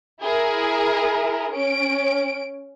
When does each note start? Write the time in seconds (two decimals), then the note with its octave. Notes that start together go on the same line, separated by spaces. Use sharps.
0.22 E4 G#4 A#4
1.52 C#4 D7